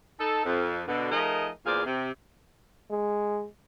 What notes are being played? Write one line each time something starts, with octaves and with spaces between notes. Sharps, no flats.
D#4 A4
F2
B2 D3
F3 A3 D#4 G#4 A#4 D#5
E2 A#2 G#4 C5 D5 F5
C3
G#3